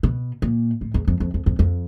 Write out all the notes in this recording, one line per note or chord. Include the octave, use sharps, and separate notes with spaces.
B2
A#2
A2
E2
F2
F2
F2
F2
F2